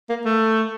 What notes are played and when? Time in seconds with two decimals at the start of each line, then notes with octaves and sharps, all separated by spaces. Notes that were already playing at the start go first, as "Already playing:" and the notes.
0.09 A#3
0.25 A3